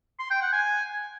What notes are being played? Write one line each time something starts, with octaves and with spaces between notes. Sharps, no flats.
C6
G5
F#5
G#5